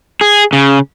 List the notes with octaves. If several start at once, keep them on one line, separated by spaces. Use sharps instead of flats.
G#4
C#3